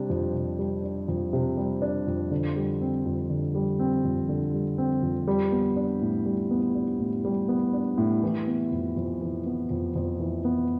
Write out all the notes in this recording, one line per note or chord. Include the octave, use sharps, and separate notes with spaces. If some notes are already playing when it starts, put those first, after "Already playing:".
Already playing: C3 G3 D4
F2
C3
G3
D4
F2
C3
G3
D4
F2
D3
G3
C4
F2
D3
G3
C4
F2
D3
G3
C4
F2
G3
B3
D4
A2
G3
B3
D4
A2
G3
B3
D4
A2
E3
B3
F2
F2
E3
B3
F2
F2
E3
B3